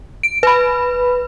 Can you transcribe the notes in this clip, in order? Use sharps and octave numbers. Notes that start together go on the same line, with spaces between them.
D7
B4 B5